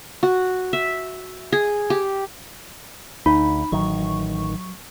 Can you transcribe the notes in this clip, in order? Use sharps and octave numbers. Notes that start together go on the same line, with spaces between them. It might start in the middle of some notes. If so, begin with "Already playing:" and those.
F#4
E5
G#4
G4
D2 D#4 B5
A1 D#3 F#3 C#6